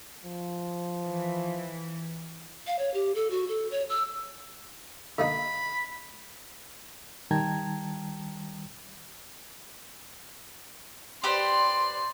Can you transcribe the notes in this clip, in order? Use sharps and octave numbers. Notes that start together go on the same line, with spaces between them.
F3
E3
F5
C#5
G4
A4
F#4
A4
C#5
E6
D3 A#3 D#4 B5
D#3 G3 G5 A5 A#5 G#6
G4 B4 C5 D5 C6